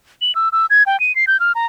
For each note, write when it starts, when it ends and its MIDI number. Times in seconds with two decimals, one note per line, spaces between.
0.21 0.34 102
0.35 0.49 88
0.52 0.66 88
0.70 0.83 92
0.86 0.99 79
1.00 1.15 99
1.15 1.25 96
1.27 1.39 91
1.40 1.52 89
1.55 1.66 82